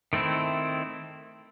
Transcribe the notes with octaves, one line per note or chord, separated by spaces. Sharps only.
D#3 A3 C4 E4